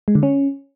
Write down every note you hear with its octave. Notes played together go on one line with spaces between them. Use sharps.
G#3
D3
C#4